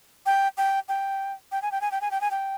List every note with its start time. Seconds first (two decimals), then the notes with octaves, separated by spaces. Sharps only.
0.26 G5
0.58 G5
0.88 G5
1.52 G5
1.62 G#5
1.72 G5
1.81 G#5
1.92 G5
2.01 G#5
2.11 G5
2.21 G#5
2.31 G5